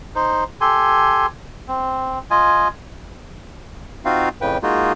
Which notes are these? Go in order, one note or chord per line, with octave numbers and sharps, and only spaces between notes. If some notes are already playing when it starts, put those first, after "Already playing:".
D#4 C5
G4 A4 G#5 C6
C4
F4 D#5 G#5
C4 D#4 F4 F#4 F5
F2 A2 C#3 B4 G5
G#3 A#3 D#4 F4 F#4 G#4